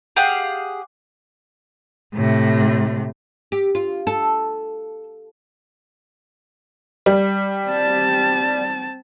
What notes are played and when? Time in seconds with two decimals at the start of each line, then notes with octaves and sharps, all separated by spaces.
0.16 G4 G#4 F5 F#5
2.15 A2 C3
3.52 G4
3.75 F4
4.07 A4
7.06 G3
7.67 C4 A5